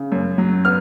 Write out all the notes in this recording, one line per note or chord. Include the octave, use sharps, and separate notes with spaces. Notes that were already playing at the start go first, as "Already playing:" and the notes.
Already playing: C#3
F#2
F#3
B3 F6